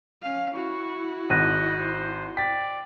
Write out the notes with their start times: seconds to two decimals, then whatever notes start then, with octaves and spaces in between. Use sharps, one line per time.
0.22 C#4 F5
0.54 E4 F#4 C#6
1.30 G#1 D#5 F#6 A#6 D#7
1.79 C5
2.37 D5 G5 A6 B6